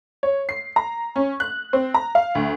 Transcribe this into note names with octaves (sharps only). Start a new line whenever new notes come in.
C#5
C7
A#5
C#4
F#6
C4
A#5
F5
D2